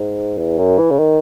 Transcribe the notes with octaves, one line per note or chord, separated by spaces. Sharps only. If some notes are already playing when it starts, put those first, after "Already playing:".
Already playing: G#2
E2
F#2
E3
C#3
D#3